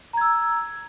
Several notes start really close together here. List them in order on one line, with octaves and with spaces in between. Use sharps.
A#5 G#6 E6